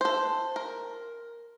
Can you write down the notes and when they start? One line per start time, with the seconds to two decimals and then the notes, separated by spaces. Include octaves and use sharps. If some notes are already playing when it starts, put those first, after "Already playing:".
0.01 A4 C5
0.56 A#4